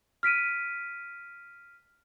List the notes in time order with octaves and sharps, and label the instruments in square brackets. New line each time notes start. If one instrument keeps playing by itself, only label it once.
[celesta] F6 B6 D7 D#7